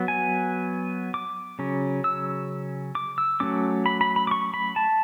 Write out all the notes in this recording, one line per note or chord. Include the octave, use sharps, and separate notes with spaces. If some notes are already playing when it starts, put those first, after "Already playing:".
Already playing: F#3 B3
G#5
D6
C#3 F#3 C#4
E6
D6
E6
F#3 A3 C#4 D6
B5
B5
B5
D6
C#6
B5
A5